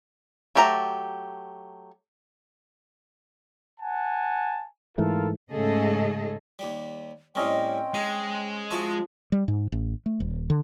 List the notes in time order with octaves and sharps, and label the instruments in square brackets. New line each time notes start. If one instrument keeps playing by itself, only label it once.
[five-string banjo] F#3 A3 G4 A5 A#5
[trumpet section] F#5 G#5 A5
[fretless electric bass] G#2 E3 A3 [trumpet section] F4 A4 A#4
[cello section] G#2 C#3 A3 G#4 A4 D#5
[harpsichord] D#2 G3
[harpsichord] A2 G3 [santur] C4 C#4 D#5 [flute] G5
[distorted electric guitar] G#3 [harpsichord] D#4
[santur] F3 [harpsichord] E4 F#4 A4
[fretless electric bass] G3
G#2
A1
A3
D#1
D3